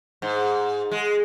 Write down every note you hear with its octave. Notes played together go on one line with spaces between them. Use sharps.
G#2
G#3